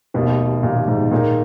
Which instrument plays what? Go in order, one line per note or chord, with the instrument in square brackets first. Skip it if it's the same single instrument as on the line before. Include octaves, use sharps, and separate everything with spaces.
[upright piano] F1 D#2 D#3 [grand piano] B2
[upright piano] F1 D#2 D#3 [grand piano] A#2
[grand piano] G#2
[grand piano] A#2 [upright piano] D#3 A#3 D#4 G#4 C#5